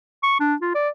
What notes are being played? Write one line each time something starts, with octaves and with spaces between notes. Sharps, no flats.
C#6
D4
F4
D5